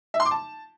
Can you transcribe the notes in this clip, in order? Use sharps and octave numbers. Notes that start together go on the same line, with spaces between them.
E5
C6
D6
A5